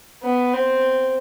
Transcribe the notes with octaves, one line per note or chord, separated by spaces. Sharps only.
B3
C4